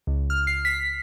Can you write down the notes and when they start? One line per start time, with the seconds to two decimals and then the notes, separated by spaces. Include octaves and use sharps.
0.07 C#2
0.30 F6
0.47 C7
0.65 B6